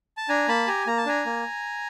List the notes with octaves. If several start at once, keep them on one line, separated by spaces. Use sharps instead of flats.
A5
D4 G#5 A#5
A#3 A5 B5
G4 G#5 A#5
A#3 A#5
A5
D4 G#5 A#5
A#3